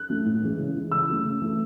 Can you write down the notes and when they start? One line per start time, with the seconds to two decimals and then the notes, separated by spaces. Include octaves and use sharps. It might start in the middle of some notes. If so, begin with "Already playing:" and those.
Already playing: F#6
0.09 F#3 A3
0.25 A2
0.42 E3 G#3
0.59 C#3
0.74 E3 G#3
0.92 C#3 E6
1.08 F#3 A3
1.25 C#3
1.42 E3 A3